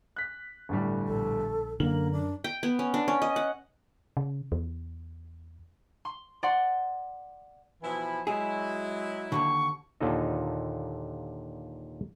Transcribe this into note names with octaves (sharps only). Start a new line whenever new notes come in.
F#6 B6
G1 A2 G3
A#1 A4
F#2 D3 A#3 A#4 F#7
D4
G5
B3
C#4
D4
C#4
D#5
F#5
C#3
E2
C6
D5 F#5 C6
B2 E3 F3 E4
F#3 G#3 E4 G#4
D#2 G#2 D3 C#6
D#2 A#2 D3 F4 A4 D#5